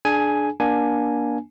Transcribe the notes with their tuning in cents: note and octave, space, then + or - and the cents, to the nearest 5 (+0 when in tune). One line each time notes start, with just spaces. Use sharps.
D4 +5 G#4 +30 G#5 +0
A#3 +30 D4 +0 G#5 +0